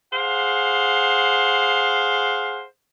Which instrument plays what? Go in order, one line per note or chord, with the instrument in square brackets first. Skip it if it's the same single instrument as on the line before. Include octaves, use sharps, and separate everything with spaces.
[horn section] G#4 C5 F5 F#5